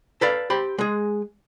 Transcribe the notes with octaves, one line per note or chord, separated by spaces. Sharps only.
A4 B4 D5 F5
G4 C5 B5
G#3 G#4